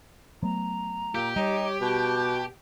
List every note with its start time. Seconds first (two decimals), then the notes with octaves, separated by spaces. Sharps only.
0.43 F#3 A3 B3 A#5
1.15 A#2 G4
1.36 G3 D#4 C#5
1.81 B2 A5